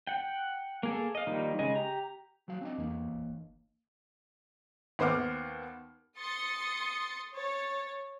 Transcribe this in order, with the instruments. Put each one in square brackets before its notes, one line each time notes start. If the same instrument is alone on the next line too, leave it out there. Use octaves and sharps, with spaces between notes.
[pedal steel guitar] F#5 G5
A#3 G#4 A4
D#5 F5
D#3 F3 G3 A#3 D#4
C#3 G#3 D#5
G4 A#5
[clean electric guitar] F#3 F#4 F5
C4 D4 D#5
[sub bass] E2 [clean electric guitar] E3 A#3
[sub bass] G#1
F#1
[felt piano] D#2 B3 C5 F#5 D6 F6
[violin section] C6 D#6 A6 C#7
C#5 A6